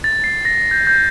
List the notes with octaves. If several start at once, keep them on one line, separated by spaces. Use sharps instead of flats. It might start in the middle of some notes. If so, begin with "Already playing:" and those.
A6
C7
A#6
G6
G6